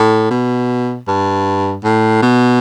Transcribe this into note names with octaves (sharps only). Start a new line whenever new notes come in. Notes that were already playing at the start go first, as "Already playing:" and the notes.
Already playing: A2
B2
G2
A2
B2